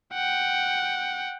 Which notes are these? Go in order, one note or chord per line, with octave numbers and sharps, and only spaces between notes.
F#5 G5